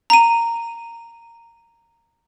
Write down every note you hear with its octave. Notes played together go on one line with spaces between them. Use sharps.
A#5 D#7